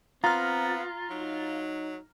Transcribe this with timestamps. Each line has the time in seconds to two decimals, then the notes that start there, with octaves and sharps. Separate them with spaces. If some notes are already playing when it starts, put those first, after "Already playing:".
0.24 B3 C4 F4 A#5 F6
1.10 F#3 D#4